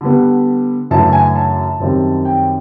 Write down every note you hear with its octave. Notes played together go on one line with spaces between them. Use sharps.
D3 G3 B3
F#2 C#3 E3 A3 D4 A5
G#5
A5
F#2 D#3 G3 C4
G5